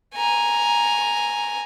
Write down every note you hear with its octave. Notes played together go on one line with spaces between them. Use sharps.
G#5 A#5